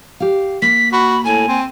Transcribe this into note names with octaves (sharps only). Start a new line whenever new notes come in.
G4 F5
A#3 B6
F#4 B5
A2 G#5
C4